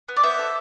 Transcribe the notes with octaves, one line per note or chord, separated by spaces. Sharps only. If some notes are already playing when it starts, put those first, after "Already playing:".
B3
D5
B3 C5 E5
A4